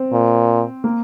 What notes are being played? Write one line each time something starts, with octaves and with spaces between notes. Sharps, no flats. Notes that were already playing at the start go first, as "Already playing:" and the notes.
Already playing: C4
A#2
A#3